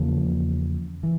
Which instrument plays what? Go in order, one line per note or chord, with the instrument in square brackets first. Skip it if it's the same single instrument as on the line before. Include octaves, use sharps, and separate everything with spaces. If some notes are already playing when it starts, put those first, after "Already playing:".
Already playing: [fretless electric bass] E2 C#3 F3 A#3
E3